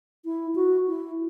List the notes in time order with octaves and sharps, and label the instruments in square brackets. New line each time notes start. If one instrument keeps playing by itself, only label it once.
[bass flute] E4
F#4
E4